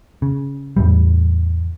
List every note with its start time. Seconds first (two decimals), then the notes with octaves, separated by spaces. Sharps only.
0.22 C#3
0.77 E2 A2 G3